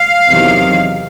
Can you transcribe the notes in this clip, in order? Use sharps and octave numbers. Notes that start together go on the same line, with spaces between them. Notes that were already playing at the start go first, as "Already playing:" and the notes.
Already playing: F5
E2 C3 D#3 F#3